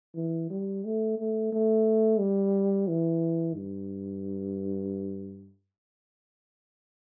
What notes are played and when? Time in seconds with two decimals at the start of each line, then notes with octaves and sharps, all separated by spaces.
0.16 E3
0.50 G3
0.84 A3
1.18 A3
1.52 A3
2.19 G3
2.88 E3
3.55 G2